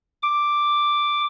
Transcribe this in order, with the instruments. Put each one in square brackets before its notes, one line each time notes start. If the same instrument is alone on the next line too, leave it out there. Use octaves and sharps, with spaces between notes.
[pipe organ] D6